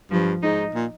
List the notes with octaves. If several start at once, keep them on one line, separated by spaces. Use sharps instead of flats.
G2 F3
G#2 D#4
A#2